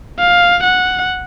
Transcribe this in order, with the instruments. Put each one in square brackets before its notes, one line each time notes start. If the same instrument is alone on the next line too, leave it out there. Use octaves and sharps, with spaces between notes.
[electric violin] F5
F#5